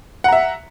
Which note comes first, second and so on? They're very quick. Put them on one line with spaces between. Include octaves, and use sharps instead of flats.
F#5 A#5 E5